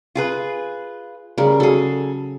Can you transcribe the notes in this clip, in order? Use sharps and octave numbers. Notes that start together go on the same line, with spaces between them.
F4 G#4 B4
C#3 G3 A#4
F#3 G#4 A4